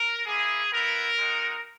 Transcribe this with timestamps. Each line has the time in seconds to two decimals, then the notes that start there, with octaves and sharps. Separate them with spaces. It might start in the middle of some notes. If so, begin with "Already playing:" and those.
Already playing: A#4
0.25 A#3 E4 G#4
0.72 B3 E4 A#4
1.18 G#3 D#4 F#4